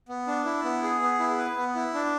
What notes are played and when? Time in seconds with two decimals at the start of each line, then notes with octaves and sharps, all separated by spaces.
0.09 B3
0.27 D4
0.45 E4
0.65 B3
0.83 G#4
1.02 B3
1.19 E4
1.38 B4
1.57 B3
1.75 E4
1.94 D4